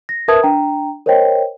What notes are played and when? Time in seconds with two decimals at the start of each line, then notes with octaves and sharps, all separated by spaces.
0.09 A#6
0.28 A#4 B4 E5 A5 D#6 G#6
0.43 D4 G5 A#5
1.06 A#4 C5 C#5 D#5 G5